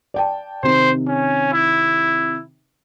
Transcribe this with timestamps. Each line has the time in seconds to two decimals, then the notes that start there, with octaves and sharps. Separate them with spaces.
0.14 D5 G5 A5
0.63 C3 D#3 C5
1.08 C#4
1.53 E4